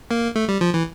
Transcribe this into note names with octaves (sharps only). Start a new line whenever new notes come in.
A#3
A3
G3
F3
E3